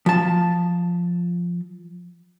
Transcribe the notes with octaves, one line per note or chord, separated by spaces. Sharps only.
F3 A5